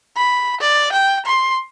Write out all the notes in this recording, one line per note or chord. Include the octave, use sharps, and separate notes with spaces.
B5
D5
G5
C6